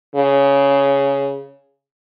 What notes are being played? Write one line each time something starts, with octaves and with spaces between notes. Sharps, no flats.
C#3